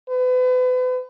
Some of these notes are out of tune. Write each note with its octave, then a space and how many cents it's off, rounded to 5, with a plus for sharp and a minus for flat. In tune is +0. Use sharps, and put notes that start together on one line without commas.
B4 +35